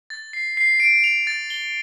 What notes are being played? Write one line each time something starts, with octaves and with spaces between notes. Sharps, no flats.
A6
C7
C7
D7
F7
A6
G7